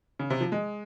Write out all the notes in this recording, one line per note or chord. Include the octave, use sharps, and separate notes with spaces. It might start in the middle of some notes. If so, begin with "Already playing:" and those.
C#3
C3
F3
G#3